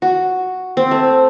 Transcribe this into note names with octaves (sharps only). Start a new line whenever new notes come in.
F#4
C4
A3